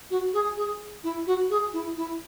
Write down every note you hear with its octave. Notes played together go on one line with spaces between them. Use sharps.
F#4
G#4
G#4
E4
F#4
G#4
E4
E4